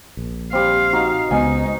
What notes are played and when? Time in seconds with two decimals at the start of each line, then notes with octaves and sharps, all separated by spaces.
0.17 A#1
0.53 G3 C4 F5
0.93 D#4 F#4
1.31 C#2 G#3 B3 D#4 G#5